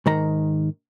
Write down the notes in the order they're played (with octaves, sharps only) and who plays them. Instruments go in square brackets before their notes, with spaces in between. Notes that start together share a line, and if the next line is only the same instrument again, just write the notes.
[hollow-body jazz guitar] G#2 D#3 A#5